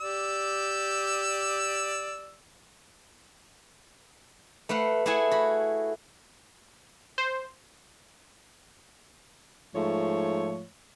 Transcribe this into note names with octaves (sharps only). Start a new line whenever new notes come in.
G4 D5 E6
A3 B4 F5 F#5
A3 E4 G#4 E5 F#5 G#5
F#4 B5
C5
G#2 F3 A3 C#5